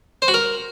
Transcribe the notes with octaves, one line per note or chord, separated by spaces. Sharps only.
C5
F#4
A#4